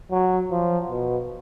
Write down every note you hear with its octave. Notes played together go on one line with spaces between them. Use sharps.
F#3
F3
B2